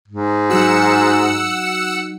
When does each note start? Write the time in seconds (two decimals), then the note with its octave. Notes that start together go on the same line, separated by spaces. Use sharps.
0.08 G#2
0.50 F#3 D#4 F#4 F#5 E6 C#7